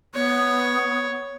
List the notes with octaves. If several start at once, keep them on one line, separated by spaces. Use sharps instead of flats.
B3 C#5